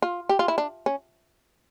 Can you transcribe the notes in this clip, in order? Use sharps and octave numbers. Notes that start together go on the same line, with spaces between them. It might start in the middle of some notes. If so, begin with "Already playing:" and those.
F4
G4
F4
E4
D4
C#4